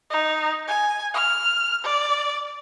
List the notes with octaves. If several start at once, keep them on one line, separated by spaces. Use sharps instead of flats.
D#4
G#5
F6
D5